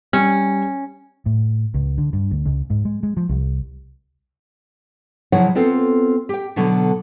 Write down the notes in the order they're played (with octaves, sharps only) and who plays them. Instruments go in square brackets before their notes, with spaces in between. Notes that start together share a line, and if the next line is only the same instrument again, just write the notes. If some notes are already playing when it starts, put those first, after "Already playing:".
[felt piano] G3 [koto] C#4
[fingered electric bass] A2
C#2
D3
G2
D2
C#2
G#2
G#3
G#3
F3
C2
[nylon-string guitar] C#3 F3 F#3 E4 C#5 F#5
B3 C4 F4 A4
G4 G5
B2 D3 F#3